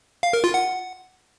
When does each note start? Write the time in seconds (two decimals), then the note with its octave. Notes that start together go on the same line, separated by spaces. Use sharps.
0.23 F5
0.33 A#4
0.44 F4
0.54 F#5